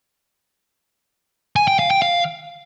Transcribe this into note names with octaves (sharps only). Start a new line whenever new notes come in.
G#5
G5
F5
G5
F5